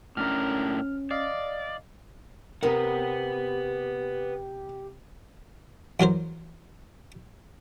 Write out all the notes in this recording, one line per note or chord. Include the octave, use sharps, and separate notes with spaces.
A2 C#4 D4 A#4 F6
D5 D#5 F5 C7
C3 B3 G4 A#4 B4 F#5
E2 F#3 A#4 C5